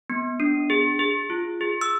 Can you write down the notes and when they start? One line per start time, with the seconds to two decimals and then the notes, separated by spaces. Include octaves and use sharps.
0.10 B3
0.40 D4
0.70 G#4
0.99 G#4
1.30 F4
1.61 G#4
1.81 E6